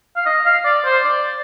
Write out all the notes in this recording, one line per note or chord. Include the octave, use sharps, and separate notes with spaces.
F5
D#5
F5
D5
C5
D5